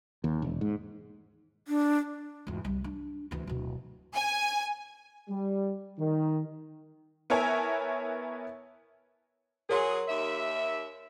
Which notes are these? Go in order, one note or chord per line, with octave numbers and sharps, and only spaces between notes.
D#2
E1
G#2
D4
G#1 E2
C2 G3
D4
D2 E3
D1 B2
G#5
G3
D#3
B3 E4 A#4 C#5 G#5 A5
F#3 G#4 A#4 C#5 C6
D#2 E5